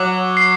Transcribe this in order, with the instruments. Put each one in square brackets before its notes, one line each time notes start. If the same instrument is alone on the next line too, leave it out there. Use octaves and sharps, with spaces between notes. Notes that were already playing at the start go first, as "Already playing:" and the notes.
Already playing: [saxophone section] F#3 [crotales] D6
[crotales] C7